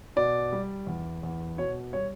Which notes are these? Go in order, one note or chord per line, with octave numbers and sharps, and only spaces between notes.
B2 D5
G3
E2
E2
B2 C#5
G3 C#5